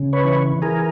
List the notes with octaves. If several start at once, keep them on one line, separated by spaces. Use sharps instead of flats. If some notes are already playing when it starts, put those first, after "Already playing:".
Already playing: C#3
B4 C#5
E3
E3 G#4 A#4